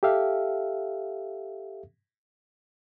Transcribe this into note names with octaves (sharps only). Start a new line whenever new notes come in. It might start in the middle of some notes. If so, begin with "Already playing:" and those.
G4 A4 E5 F5